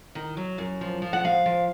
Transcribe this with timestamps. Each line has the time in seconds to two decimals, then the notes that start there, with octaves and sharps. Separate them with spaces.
0.15 D#3
0.37 F#3
0.58 F#2
0.81 F3
1.02 F3
1.13 F#5
1.24 F3 F5
1.46 F3